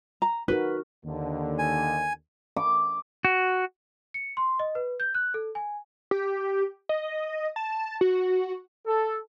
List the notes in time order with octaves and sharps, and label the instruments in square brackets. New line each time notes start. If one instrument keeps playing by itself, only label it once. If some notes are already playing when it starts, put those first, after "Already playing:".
[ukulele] A#5
[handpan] D#4 F#4 A#4 [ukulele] B4
[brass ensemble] D#2 D3
[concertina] G#5
[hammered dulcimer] D6
[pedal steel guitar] F#4
[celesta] C#7
C6
D#5
B4
G6
F#6
A4
G#5
[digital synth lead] G4
D#5
A5
F#4
[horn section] A4